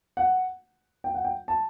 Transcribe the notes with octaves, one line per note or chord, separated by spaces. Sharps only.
F#5
G5
F#5
G5
A5